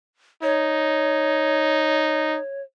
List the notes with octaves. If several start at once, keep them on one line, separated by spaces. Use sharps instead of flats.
D#4 C#5